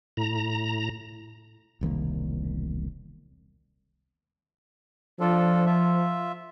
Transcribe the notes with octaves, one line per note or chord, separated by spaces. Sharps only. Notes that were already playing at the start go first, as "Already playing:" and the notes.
A2 A#5
E1 C2 D#3 A#3
F3 D4 F4 A4
F4 E5